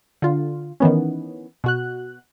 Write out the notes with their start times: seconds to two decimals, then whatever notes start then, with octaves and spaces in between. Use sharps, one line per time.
0.22 D3 F4
0.80 D#3 E3 B3 C#4
1.64 B2 F#4 F#6